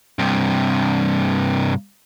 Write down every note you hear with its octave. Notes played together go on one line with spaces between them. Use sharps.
G2 C3